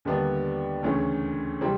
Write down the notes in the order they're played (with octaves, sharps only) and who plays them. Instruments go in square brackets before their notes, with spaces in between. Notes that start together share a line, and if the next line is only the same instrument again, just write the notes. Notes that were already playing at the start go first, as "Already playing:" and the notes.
[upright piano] D#2 D3 G3 B3 D4
D2 C#3 E3 A3 C#4
C3 E3 G3 C4